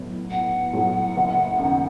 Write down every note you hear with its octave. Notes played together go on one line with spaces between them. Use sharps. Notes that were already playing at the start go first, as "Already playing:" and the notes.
Already playing: B1 A2 F#3 B3
B1 F#5
A2 F#3 B3
F#1
F#2 D#3